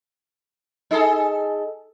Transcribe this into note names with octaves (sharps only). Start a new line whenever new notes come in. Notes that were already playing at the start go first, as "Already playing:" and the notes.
D#4 G#4 A4